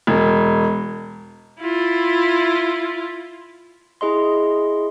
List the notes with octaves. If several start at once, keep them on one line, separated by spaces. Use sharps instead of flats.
E1
E4 F4
E4 G#4 D#5 C6